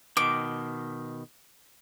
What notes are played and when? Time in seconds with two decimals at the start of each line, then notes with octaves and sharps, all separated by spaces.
0.17 B2 D#3 D6